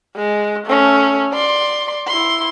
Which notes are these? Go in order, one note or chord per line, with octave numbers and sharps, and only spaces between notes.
G#3
A3 C#4
D5 C6
E4 C6